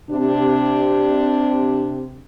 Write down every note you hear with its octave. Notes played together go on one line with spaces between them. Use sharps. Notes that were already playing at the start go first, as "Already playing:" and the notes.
C3 D4